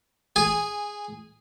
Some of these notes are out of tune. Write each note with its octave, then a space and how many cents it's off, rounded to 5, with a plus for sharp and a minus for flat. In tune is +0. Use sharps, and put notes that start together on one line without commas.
G#4 -5 G#5 -15